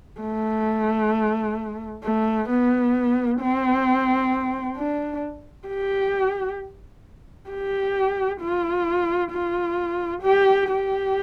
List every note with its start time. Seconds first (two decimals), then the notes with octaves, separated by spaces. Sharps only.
0.21 A3
2.04 A3
2.50 B3
3.41 C4
4.77 D4
5.68 G4
7.50 G4
8.41 F4
9.32 F4
10.23 G4
10.69 G4